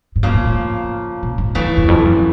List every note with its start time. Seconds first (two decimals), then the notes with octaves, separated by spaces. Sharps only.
0.16 G#2
0.23 G2 C#3 F3 A#3
0.34 A2
0.45 A2
1.23 A#2
1.38 G#2
1.55 G2 C#3 E3 A3
1.77 F#2
1.83 E2
1.88 F2
2.01 G2
2.05 F#2